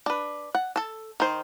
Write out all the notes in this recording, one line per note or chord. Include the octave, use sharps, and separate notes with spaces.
D4 B4
F#5
A4 A5
D#3 C5